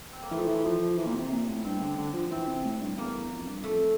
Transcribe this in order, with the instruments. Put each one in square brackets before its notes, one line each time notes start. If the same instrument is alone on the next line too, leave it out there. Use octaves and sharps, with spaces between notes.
[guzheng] C4
A#3
[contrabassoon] E3 [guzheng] A3
[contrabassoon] F3
E3
F3
[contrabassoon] E3 [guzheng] A#3
[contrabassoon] A#2
C3
A#2
A2
[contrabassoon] G2 [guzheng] C4
[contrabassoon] D3
D3
F3
[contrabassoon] E3 [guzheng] C4
[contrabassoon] C3
A2
G2
[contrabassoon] E2 [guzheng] A#3
[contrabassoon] E2
F2
G2
[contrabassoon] F2 [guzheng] A3